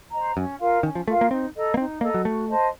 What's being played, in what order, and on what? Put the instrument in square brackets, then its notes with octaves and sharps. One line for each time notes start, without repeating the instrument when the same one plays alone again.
[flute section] C5 D#5 A#5
[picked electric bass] F#2 [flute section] C#4
[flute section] F4 A#4 F5
[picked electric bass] D#3 [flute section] C#4
[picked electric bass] F3
[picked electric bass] A3 [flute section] F4 A#4 F5
[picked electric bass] A#3
[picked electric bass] C4 [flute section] D#4
[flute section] A4 D#5 A#5
[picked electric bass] A#3
[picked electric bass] C4 [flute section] D#4
[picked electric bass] A#3 [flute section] A4 D#5 A#5
[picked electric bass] F#3
[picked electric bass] A3 [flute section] F#4
[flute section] C5 D#5 A5